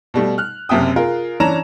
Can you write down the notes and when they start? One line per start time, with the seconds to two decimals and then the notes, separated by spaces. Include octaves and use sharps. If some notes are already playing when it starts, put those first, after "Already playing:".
0.14 B2 G3 A3
0.38 F6 F#6
0.69 F#1 F#2 C3 E5 G5 D#6
0.96 F4 G#4 A#4
1.40 E3 C#4 D4 A5 A#5 E7